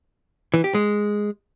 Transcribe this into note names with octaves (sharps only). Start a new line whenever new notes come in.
E3
G4
G#3